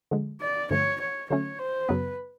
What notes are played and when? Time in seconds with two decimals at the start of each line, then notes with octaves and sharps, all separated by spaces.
0.11 D3 F3 G#3
0.41 D5
0.71 G2 D3 F3 A3 C#5
1.00 C#5
1.30 D3 F#3 A3 C#4 C#5
1.59 C5
1.88 F#2 C#3 F#3 B3 B4